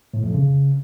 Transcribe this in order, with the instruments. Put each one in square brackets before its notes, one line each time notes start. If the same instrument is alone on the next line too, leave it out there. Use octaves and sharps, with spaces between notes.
[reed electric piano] A2
F2
C#3